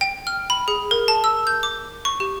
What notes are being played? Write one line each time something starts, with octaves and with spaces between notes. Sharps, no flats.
G5
F6
B5
G#4
A#4
A5
E6
G6
D6
C#6
G4